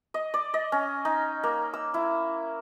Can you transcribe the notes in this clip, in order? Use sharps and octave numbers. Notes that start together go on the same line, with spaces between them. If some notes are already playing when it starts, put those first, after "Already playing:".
D#5
D5
D#5
C#4
D#4
A#3
E6
E4